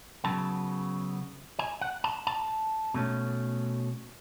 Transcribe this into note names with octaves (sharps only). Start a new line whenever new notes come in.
C#3 F#3 B3 A5
G#5
F#5
A5
A5
B2 A3 C#4